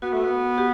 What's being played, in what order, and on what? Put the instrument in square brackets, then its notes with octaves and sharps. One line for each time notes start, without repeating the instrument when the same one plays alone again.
[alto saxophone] B3 [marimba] F#4
[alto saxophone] A3
B3
[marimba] G4